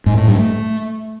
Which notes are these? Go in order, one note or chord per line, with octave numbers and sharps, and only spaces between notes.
G#2
A2
G2
A3